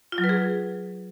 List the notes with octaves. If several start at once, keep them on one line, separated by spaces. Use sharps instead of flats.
F4
F#3
B4
G#4